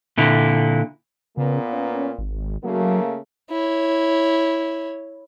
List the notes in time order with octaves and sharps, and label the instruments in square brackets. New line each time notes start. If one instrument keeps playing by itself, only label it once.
[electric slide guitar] A#2 D3 E4
[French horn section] A#2 A#3 B3 [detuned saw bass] C#3
[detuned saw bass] C#4
G#1
[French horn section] C#3 A3 A#3 [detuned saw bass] F#3
[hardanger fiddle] E4 C#5